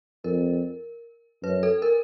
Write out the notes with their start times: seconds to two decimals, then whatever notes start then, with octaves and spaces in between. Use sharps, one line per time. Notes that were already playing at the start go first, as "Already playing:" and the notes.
0.24 F2 A#4
1.43 F#2 B4
1.63 A4
1.82 A#4